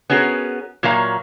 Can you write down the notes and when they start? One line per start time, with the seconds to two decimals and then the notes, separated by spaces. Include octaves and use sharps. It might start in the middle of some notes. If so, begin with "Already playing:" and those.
0.10 B3 C#4 F#4 G#4 A#4
0.83 A#2 F#3 A#3 C#5 F5 A#5